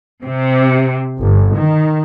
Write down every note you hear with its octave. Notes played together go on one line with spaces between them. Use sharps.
C3
G1
D#3